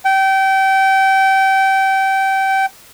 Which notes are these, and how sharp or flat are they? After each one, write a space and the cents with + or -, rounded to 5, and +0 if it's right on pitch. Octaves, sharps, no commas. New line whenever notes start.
G5 -25